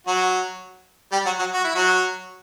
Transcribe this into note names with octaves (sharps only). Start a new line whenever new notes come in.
F#3 F#4
G3 G4
F#3 F#4
F#3 F#4
F#4
E4
F#3 F#4